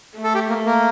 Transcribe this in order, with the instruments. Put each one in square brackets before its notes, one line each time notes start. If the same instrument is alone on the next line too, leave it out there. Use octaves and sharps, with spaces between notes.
[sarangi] A3
[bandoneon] A4
G4
A#3
A#3